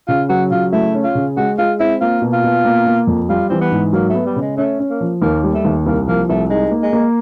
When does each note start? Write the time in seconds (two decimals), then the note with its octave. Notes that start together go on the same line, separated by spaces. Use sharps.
0.08 C#3 F4
0.29 F#3 F#4
0.51 C#3 F4
0.72 A3 E4
0.94 C#4
1.04 F4
1.15 C#3
1.37 G#3 F#4
1.58 G#3 F4
1.80 C4 E4
2.01 A#3 F4
2.22 B2
2.33 F4
2.44 B2
2.65 A#3
2.86 A#3
3.07 F2
3.29 G3 F4
3.50 E3 C4
3.61 B3
3.71 G#2
3.93 F#3 A#3
4.10 A3 B3
4.26 G3
4.36 C#3 G#3
4.57 A3 C#4
4.80 C#4
4.90 A#3
5.01 F3
5.22 D#2 A#3
5.43 G3
5.54 A3
5.65 D#2
5.86 C2 A#3
6.07 F3 A#3
6.29 C2 A3
6.50 G#3 D#4
6.71 A#3
6.82 G#3
6.93 A#3